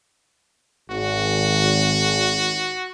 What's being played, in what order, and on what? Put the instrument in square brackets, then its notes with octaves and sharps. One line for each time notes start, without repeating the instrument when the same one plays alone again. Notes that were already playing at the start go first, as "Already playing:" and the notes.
[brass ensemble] G#1 [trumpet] F#4